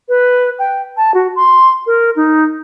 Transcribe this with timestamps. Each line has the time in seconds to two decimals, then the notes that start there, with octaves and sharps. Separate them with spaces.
0.09 B4
0.59 G5
0.97 A5
1.14 F#4
1.36 C6
1.86 A#4
2.16 D#4